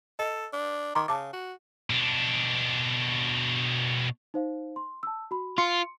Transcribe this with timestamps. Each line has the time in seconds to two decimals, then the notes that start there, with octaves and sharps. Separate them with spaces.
0.19 A4 D#5
0.53 D4
0.95 D#3 A#5 C6 D6
1.08 C#3 A5 D6
1.33 F#4
1.90 B2 D4
4.34 D#4 C5 F5
4.76 C6
5.03 A5 E6
5.31 F#4 B5
5.58 F4 C6 C#7